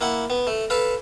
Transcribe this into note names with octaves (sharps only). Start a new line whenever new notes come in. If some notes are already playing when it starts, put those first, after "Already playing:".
A#3 E4 F#5
B3
A3
A4 B4 F5